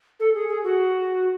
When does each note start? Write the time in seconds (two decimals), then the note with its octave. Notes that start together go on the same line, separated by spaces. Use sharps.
0.20 A4
0.34 G#4
0.48 G#4
0.64 F#4